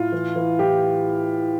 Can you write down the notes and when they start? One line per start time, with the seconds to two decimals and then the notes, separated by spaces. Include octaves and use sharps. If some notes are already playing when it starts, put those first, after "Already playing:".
Already playing: A2 F4
0.12 E3
0.36 E3
0.59 A2 G4